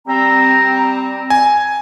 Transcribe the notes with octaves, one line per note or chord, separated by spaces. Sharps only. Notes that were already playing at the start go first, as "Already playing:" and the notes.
G3 C4 A#5
G#5